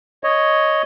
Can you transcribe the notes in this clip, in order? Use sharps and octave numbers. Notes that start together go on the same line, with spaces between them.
C#5 D#5